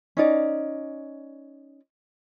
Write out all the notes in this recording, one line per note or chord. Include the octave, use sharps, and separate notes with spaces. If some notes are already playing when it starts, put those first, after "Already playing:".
C#4 D#4 D5